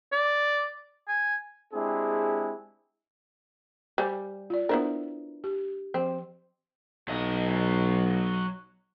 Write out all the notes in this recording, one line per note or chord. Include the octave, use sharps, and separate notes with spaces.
D5
G#5
G#3 C4 D4 E4 G4 G#4
G3 C5 G#5 D6
F4 D5
B3 D4 E4 A#4 C5
G4
F3 C4
B1 F#3 D#5